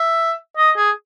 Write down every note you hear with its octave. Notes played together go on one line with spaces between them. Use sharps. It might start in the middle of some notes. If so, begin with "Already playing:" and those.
Already playing: E5
D#5
G#4